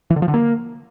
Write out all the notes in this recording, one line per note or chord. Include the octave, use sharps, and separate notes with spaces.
E3
D3
F3
D3
A#3